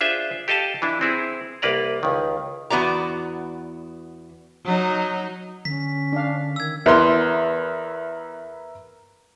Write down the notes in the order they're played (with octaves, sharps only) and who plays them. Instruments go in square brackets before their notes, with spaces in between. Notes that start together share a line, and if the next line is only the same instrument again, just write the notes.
[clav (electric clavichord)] D4 F4 G#4 C5 E5
G4 A4 D#5 F5 A5
E3 D4 E4
C4 E4 G#4
C2 A#3 B4 D5 A#5
C#2 D#3
[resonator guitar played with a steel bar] E2 B3 F#4 D5 A#5
[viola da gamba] F#3 D#4
[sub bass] D3 [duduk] C#4 [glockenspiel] B6
[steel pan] D4 F5
[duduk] D#3 [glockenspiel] E6 G#6
[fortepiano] E2 C6 [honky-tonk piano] A#4 B4 E5